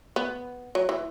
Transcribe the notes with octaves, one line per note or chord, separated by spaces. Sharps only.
B3
F#3
E3